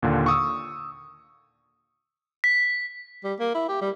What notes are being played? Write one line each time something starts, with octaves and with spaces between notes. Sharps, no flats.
D#2 A#2 D3
C#6 D#6 E6
B6
G3
A#3
E4
G4
G3